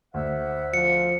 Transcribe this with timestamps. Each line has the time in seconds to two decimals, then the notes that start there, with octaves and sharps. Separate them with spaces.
0.14 D2 C5 E5 F#5
0.74 F3 C#7